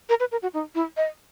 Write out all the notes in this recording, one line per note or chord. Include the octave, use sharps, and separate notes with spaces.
A#4
B4
A#4
F#4
D#4
E4
D#5